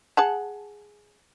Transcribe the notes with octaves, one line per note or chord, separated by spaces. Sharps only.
G#4 F#5 A5